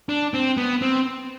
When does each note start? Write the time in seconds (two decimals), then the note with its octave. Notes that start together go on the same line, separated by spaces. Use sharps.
0.09 D4
0.34 C4
0.57 B3
0.82 C4